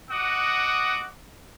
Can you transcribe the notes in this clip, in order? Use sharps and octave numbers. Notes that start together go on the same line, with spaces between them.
F#4 D#5 F#5 D6 D#6